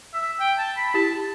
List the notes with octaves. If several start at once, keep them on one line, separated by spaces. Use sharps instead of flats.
E5
G5
A5
B5
E4 G4 A5